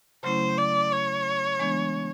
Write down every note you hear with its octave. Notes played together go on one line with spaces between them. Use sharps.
C#3 F#3 A3 C#4 E4 C5
D5
C#5
E3 G#3 B3 D4